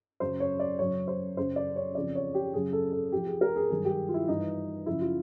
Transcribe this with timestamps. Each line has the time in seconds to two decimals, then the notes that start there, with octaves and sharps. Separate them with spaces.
0.20 F#2 C#3 F#3 C5
0.40 C#5
0.59 D5
0.79 F#2 C#3 F#3 C#5
1.08 C5
1.37 F#2 C#3 F#3 C5
1.56 D5
1.76 C#5
1.95 F2 C#3 F3 D5
2.15 C#5
2.34 G4
2.54 F#2 C#3 F#3 G#4
2.73 A4
2.92 A4
3.12 F2 C3 F3 G4
3.26 G#4
3.41 A#4
3.56 G#4
3.70 G2 D#3 F#3 G#4
3.85 G4
4.09 F4
4.14 E4
4.28 G2 E3 D#4
4.86 F#2 C#3 F3 E4
5.01 F4